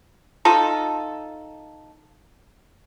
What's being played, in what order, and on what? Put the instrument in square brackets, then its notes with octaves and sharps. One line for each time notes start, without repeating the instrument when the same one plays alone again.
[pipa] D#4 F4 A4